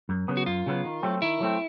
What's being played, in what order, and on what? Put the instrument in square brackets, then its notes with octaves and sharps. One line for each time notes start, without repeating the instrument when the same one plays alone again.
[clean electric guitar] F#2
C#3 F#3 B3
[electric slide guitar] F#4
[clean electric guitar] F#2 [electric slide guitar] F4
[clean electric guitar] C#3 F#3 B3
D#3
F#3 A3 C4
[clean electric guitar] D#3 [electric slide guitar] E4
[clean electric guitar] F#3 A3 C4